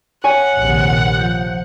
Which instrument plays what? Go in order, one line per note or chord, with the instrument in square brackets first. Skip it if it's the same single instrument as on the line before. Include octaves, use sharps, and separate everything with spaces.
[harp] C#5 G#5 [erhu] F#5
[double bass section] A#1 D#2 C3
[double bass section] F3 [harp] G6